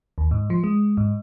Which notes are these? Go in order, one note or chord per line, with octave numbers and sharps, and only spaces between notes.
D#2
G#2
F3
G#3
G#2